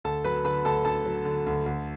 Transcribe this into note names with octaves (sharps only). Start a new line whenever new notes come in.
D2 A4 A5
F#3 B4 B5
D3 B4 B5
D2 A4 A5
D2 A4 A5
F#3
D3
D2
D2